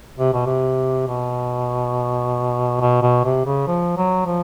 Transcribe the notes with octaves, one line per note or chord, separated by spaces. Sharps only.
C3
B2
C3
B2
B2
B2
C3
C#3
F3
F#3
F3